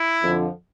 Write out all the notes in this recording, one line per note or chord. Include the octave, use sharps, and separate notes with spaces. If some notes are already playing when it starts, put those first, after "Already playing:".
Already playing: E4
F2 D3 F3